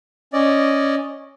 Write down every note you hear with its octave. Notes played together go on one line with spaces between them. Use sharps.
C#4 D5 D#5